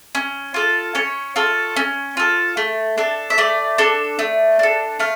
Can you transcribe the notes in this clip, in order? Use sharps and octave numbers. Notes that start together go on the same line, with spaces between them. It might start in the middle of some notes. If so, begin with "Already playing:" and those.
C#4
F4 A4
C#4 C#5
F4 A4
C#4
F4 A4
A3
D4 A4
E5
A3 D5
D4 A4
A3
D4 A4
A3 F5